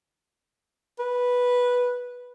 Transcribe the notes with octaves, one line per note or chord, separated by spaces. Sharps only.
B4